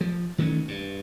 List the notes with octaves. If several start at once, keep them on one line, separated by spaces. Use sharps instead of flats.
F3
D#3 E3 A3 C#4
G2